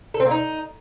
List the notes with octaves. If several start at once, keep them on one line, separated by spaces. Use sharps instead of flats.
A4
C4
A#3
D#4